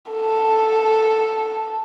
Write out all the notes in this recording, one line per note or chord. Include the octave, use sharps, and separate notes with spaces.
A4